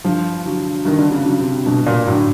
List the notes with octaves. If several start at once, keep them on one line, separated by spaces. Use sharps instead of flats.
G2 F3
D3 F#3
G2 D#3
D3
C#3
D3 F#3
C3
G2 B2
A#2
A2 D3 F#3